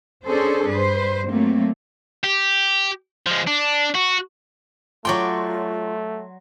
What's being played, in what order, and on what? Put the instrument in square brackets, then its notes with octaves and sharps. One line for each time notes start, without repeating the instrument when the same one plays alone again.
[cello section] C#4 D4 G#4 A4 C5
G2 B4 C5
F#3 A3 A#3 C4
[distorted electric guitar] G4
F3 G#3
D4
F#4
[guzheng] F#3 D5 G5 [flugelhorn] A3 [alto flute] F4 [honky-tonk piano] C6 C#6